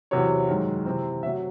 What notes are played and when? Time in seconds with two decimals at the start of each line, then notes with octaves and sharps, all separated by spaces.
0.11 E2 C3 F#3 C#5
0.49 F#2 D#3 G#3
0.86 C3 E3 C4
1.23 C3 F#3 A3 E5